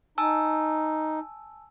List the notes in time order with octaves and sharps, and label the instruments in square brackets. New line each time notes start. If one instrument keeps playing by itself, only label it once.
[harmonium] D#4 [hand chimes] G#5 A5 E6